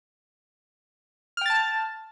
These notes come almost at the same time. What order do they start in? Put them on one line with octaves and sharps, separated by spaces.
F6 G5 A6 A5